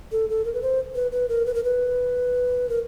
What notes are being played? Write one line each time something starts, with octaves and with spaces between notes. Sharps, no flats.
A4
A4
A#4
B4
C5
B4
B4
A#4
B4
A#4
B4
A#4